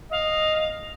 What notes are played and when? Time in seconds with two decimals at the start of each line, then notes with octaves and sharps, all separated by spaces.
0.11 D#5 F5